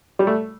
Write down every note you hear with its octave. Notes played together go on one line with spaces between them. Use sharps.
G3
A3